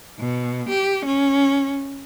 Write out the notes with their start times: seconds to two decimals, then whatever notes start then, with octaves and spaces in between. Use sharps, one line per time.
0.19 B2
0.69 G4
1.05 C#4